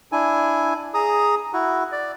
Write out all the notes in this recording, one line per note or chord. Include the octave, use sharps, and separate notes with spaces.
D4 E4 G#5
G#4 A#5 D#6
E4 F#4
D5